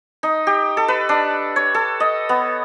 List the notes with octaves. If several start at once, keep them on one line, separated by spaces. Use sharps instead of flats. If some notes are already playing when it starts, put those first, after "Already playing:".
D#4
G4
A4
B4
D4
C#5
A4
D#5
B3